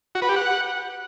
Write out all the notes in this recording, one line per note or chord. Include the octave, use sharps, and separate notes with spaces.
F#4
B4
G4
F#5